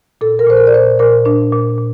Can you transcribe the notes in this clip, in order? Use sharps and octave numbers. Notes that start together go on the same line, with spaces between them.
A#2 A4
A#4
A#2 C5
A#4
D5
A#2 C5
A#2 A#4
A#2 D4
A#2
A#2